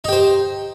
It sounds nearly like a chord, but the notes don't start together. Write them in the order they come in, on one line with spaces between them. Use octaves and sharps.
D#4 G4 C5